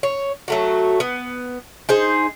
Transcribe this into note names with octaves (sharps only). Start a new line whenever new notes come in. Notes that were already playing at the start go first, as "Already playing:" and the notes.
C#5
F#3 A3 F#4
B3
D#4 G#4 C5